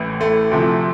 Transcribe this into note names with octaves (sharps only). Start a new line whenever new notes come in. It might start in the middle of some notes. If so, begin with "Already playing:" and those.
Already playing: A1 A2 E3
A3
D2 C3 F3